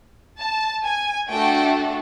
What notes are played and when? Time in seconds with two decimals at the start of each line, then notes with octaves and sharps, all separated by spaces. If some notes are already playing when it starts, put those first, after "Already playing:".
0.39 A5
0.84 G#5
1.29 A3 D4 F#4 A4 G5